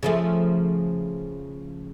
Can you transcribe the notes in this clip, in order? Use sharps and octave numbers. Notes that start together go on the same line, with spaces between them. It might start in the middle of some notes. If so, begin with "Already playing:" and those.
C#3 F3 A3